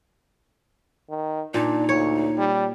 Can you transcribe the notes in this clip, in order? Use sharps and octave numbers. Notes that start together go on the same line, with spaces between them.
D#3
A#2 D4 D#4
D2 C#5
G3